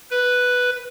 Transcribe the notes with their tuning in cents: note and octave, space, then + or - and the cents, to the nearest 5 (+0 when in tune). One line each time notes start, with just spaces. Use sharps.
B4 +0